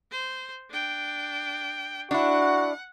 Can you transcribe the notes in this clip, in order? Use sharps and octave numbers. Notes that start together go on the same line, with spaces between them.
C5
D4 G5
D4 E4 F#4 F#5